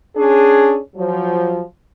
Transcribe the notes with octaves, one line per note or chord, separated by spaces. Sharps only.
C#4 D4 G#4
F3 F#3